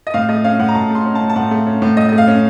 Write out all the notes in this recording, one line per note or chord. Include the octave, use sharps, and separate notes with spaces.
D#5
A2 F5
A3 D#5
C#4 F5
A2 F#5
A#5
A2 A5
A3 C6
C#4
A5
A2
A5
A2 F#5
A3
C#4
A2
A2 D#5
A3 D#5
F5
C#4